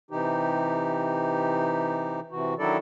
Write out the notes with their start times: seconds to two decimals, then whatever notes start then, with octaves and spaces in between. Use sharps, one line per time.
0.11 C3 E3 D#4 G4
2.31 C3 E3 F#4
2.59 D#3 F#3 D4 E4 A4 D5